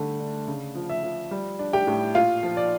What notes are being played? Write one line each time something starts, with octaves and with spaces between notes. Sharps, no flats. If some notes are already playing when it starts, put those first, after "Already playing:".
Already playing: D3 G3 A3
D4
C#3
F3
E5
F3
G3
D4
G4 G5
A2
A#2 F4 F5
F3
D5